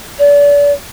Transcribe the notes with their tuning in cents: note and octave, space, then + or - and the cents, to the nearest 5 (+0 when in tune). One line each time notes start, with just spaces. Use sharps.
D5 -35